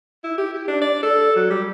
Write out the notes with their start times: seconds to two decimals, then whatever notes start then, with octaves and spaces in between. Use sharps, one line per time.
0.24 E4
0.38 G4
0.54 G4
0.68 D4
0.81 D5
1.03 A4
1.36 F#3
1.50 G3